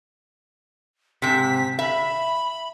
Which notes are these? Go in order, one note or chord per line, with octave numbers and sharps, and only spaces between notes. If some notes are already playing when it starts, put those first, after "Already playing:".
G#2 C3 B6
E5 B5